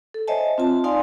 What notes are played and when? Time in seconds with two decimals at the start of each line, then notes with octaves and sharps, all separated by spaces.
0.14 A4
0.28 C5 C#5 D#5 E5 G#5 A5
0.58 C4 F4 A5
0.84 D#4 D5 F5 G#5 C6